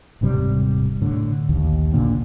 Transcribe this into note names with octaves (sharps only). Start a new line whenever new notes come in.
D#1 G#2 C3 G3
A2 D3
A#1 D#2
A#2 D3 A#3